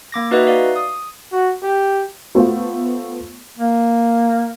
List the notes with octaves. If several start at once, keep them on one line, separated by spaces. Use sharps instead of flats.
A#3 D6 A#6
D#4 F#4 B4 D#5 E5
D5 F5
D#6
F#4
G4
A3 B3 F4 C5
A#3